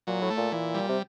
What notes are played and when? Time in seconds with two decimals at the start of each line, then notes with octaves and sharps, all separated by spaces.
0.07 A#2 F#3
0.22 A2
0.30 A3
0.37 A#2
0.52 A#2 E3
0.74 G3
0.89 C3